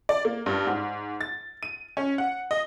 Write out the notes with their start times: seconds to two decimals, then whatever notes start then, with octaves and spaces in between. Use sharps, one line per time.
0.09 D5
0.25 A#3
0.46 G2
0.67 G#2
1.21 A6
1.63 D#7
1.97 C#4
2.18 F#5
2.51 D#5